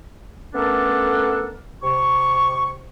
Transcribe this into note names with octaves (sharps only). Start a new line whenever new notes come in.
A3 B3 C#4 D4 A4 A#4
C3 C#6